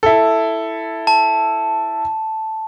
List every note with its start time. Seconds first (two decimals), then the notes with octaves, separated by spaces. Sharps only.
0.03 E4 A4
1.07 A5